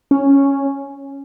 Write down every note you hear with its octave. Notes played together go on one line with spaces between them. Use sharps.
C#4